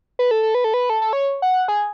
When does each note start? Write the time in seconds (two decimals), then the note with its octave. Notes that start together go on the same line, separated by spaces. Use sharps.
0.19 B4
0.31 A4
0.43 A4
0.55 B4
0.64 A4
0.74 B4
0.90 A4
1.02 A4
1.13 C#5
1.42 F#5
1.68 G#4